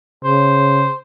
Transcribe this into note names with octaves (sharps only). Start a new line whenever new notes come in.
C#3 C5